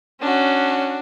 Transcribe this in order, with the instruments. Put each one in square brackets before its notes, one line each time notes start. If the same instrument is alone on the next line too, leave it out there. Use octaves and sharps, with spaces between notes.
[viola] C#4 [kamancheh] D4 F#4